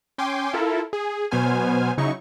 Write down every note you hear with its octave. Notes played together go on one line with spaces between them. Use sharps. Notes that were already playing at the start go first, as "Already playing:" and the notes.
C#4 G5 G#5 C6 D6
E4 F4 A4 A#4
G#4
B2 F#3 B3 C5 G#5 F6
C#3 F#3 D#4 E4 C#6